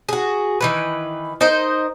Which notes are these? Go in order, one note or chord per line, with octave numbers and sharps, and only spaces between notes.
F#4 G#4
D#3 E3 B4
D#4 A#4 C5 D#5